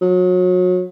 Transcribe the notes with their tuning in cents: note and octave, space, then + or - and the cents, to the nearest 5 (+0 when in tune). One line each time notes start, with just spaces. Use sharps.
F#3 -30